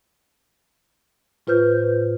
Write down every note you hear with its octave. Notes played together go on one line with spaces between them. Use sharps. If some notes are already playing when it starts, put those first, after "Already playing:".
A2 F4 B4 C5 F6 G6